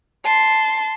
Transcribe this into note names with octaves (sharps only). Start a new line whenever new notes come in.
A5 C6